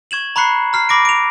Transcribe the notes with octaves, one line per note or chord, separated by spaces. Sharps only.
C#6 G#6 E7 F#7
A#5 B5 C#6 F#6 C7 C#7
A#5 F6 C7
B5 D6 A#6 D7
D7 F7